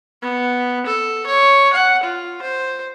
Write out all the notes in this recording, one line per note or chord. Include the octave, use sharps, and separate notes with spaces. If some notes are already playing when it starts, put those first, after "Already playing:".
B3
A4
C#5
F#5
F4
C5